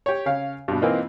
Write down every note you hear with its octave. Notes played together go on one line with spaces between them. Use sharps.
G4 C#5
C#3 C#5 F5
G2 B2
E3 A#3 C4 D#4 F4